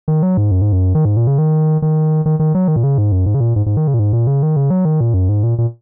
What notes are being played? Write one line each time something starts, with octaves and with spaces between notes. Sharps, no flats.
D#3
F#3
G#2
F#2
G#2
F#2
D#3
G#2
A#2
C#3
D#3
D#3
D#3
D#3
F#3
D#3
A#2
C#3
G#2
F#2
G#2
C#3
A#2
G#2
G#2
D#3
C#3
A#2
G#2
A#2
C#3
D#3
C#3
F#3
D#3
A#2
F#2
G#2
A#2
A#2